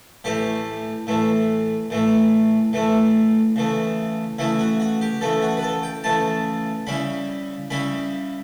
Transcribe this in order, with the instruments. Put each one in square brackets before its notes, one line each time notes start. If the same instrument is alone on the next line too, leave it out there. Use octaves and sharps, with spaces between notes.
[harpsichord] A2 E3 A3 G4
A2 E3 A3
A2 E3 A3
A2 E3 A3
C#3 E3 A3
C#3 E3 A3 E4
F#4
F#4
G4
C#3 E3 A3 A4
F#4
B4
A4
G5
C#3 E3 A3 A5
C#3 G3 C#4 E4 B5
C#3 G3 C#4 E4 B5